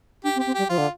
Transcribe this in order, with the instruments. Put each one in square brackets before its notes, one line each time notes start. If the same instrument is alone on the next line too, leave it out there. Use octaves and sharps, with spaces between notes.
[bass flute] D4 [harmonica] G4
[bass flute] C4
[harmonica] G4
[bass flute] C4
[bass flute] G3 [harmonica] G4
[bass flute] F3 [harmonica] F4
[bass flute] D3